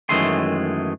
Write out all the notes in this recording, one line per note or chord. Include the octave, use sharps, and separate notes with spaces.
F#2 D#3 E3 G#3 A3 C6